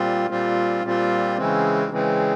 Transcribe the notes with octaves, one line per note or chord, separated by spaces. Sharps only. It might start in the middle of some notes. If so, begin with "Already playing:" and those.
Already playing: A#2 G3 C4 F4
A#2 G3 C4 F4
A#2 G3 C4 F4
C#3 E3 G#3 C4
C#3 E3 G#3 C4